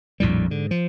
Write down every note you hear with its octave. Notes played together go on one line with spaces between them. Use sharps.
A#1 F2 A2 G3
G#2 D3
F3